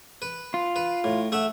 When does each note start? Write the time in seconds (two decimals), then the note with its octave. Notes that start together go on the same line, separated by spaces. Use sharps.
0.22 B4
0.54 F4
0.76 B4
1.04 A2
1.32 A3 E5 F#5